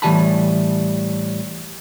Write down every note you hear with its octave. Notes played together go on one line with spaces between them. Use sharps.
A2 E3 G3 G#5 A5 B5